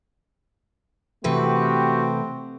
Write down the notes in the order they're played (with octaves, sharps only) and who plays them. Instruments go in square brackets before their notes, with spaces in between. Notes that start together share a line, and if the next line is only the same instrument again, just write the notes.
[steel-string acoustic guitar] C3 E3 B4 [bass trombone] A3 [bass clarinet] C4 [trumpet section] F#4 G4